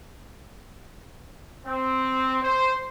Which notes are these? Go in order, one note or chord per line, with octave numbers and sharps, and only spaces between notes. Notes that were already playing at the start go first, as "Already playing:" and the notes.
C4
C5